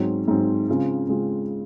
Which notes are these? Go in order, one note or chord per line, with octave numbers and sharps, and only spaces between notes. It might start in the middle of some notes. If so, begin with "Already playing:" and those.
Already playing: G#2 F#3 C4
G#2 F#3 C4
C#3 G#3 C4 F4
C#3 G#3 C4 F4